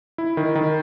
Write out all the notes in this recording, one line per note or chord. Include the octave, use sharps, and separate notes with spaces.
E4
D#3
D#3